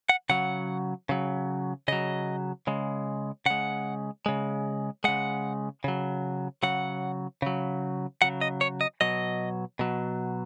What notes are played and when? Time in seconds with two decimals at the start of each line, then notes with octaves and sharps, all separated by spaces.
0.09 F#5
0.29 C#3 F#3 F#5
1.09 C#3 F#3
1.88 C#3 F#3 D#5
2.67 C#3 G#3
3.46 C#3 G#3 F#5
4.26 C#3 G#3
5.04 C#3 G#3 F#5
5.84 C#3 F#3
6.63 C#3 F#3 F#5
7.42 C#3 F#3
8.22 C#3 F#3 F#5
8.41 D#5
8.61 C#5
8.81 D#5
9.01 B2 F#3 D#5
9.79 B2 F#3